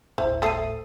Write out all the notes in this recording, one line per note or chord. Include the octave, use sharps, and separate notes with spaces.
G1 D2 A2 E3 C5
A3 A4 D#6 C7 D#7